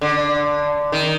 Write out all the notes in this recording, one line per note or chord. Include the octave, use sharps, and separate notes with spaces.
D3
D#3